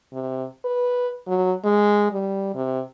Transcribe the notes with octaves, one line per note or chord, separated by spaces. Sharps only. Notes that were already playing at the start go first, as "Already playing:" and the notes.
C3
B4
F#3
G#3
G3
C3